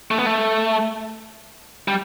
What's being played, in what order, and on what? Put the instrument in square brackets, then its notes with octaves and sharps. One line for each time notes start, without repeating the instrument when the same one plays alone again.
[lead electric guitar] A3
B3
A3
G3